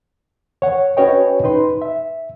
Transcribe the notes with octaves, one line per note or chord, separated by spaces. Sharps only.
C#5 F#5
C#4 F#4 B4 C#5 D#5 G5
D#4 B4 C6
E5